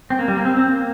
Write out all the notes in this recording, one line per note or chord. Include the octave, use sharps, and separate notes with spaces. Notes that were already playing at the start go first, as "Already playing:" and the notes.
C4
A#3
G3
A#3
C4
C4
A#3